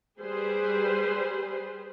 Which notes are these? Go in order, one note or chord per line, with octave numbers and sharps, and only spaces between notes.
G3 G#4 B4 C5